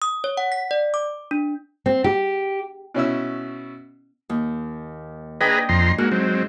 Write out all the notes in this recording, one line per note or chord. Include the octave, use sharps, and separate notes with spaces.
D#6
C#5
F#5
B6
D5
D6
D4
C4
G4
B2 C#4 E4 E6
D#2
D4 G#4 B4 D#5 G5 A#5
F2 A#5 C6
G#2 A#3 F#4
F#3 C4